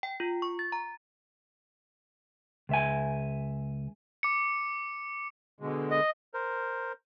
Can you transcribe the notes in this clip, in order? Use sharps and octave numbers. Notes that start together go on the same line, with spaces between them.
G5
F4
C#6
A6
A#5
C#2 E5 G#5
D6 C#7
B2 D3 G#3
D#5
A#4 C5